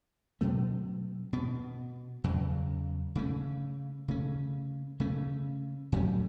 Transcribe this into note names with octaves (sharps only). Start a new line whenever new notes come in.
B2 F#3 A3 C#4
B2 B3
E2 C#3 F#3
C#3 A3 C#4
C#3 A3 C#4
C#3 A3 C#4
A2 F#3 A3 C#4